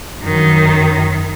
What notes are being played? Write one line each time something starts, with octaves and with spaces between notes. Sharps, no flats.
F#2 D#3